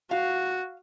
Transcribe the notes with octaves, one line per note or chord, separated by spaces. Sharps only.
F#4 F5